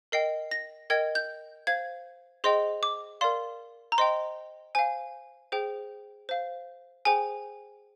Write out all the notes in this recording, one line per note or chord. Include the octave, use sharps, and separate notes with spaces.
A#4 D#5 G5 C7
A#6
A#4 D#5 G5 G#6
G6
C5 F5 G#6
G#4 C5 D#5 G5 C6
D6
A#4 D5 F5 C6
A#5
C5 D#5 G5 C6
C5 F5 G#5
G#4 C5 G5
C5 F5
G#4 C5 G5 G#5